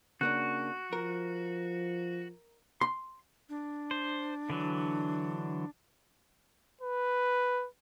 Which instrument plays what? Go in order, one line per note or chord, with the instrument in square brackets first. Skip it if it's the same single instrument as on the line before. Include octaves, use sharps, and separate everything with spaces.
[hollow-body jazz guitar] C#3 A#3 D4 [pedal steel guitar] F#4 [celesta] F#6
[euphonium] F3 [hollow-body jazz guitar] A#4
[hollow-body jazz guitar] C6
[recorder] D4
[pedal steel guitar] C5
D3 E3 F#3
[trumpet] B4